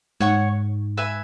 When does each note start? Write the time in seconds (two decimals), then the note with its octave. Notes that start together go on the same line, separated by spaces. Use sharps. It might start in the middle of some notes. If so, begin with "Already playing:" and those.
0.20 G#2 C#5 F#5 C#6
0.97 B4 E5 G#5